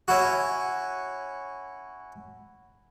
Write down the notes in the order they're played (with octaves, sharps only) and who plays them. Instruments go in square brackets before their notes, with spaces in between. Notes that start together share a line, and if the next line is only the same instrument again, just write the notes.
[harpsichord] C#4 E4 F#4